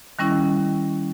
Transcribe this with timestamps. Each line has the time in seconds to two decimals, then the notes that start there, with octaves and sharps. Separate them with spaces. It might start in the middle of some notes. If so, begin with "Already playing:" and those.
0.19 D#3 G3 C#4 E4